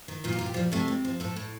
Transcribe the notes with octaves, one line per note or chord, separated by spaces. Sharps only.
D#3
A#2 F4
G4
A#2 F4
G4
F3 G3 F4
C3 A3 A4
C3
F3
A2 A3 A4
A2